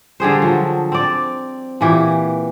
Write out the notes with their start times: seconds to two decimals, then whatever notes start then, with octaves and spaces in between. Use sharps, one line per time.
0.20 D3 G3 G#4 C5
0.42 F3 F#3
0.92 C4 D5
1.81 A#2 E3 G4